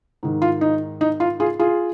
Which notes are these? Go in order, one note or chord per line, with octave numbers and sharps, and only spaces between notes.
G#2 D#3
F4
D#4
D#4
F4
F4 G#4
F4 G#4